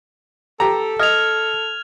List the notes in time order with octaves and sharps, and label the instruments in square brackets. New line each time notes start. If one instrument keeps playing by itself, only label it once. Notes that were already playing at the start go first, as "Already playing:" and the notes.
[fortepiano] G4 A#5 [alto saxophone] A4
[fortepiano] D#5 [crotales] F6 G#6 F7